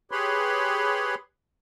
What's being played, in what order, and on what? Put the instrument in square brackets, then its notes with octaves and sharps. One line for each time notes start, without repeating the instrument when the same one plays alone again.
[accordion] G4 G#4 B4 C#5 B5 C6